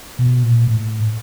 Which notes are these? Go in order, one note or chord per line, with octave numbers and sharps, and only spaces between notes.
B2
A#2
A2